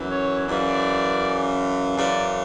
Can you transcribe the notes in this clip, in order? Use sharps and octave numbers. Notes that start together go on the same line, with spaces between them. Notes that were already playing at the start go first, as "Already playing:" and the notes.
Already playing: F#2 E3
C#5
F#2 C#3 E3 D5
F#2 C#3 E3 D5